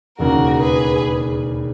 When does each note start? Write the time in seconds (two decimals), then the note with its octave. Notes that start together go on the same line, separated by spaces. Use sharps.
0.19 E1 D#2 C#3 F#4 A#4
0.61 G#4 B4